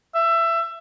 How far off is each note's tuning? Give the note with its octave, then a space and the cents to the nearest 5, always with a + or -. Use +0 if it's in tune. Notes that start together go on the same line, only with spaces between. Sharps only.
E5 +20